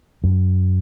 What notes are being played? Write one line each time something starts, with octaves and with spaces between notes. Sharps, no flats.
F#2